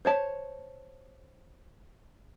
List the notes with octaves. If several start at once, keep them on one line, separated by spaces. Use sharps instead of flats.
C5 C#5 A5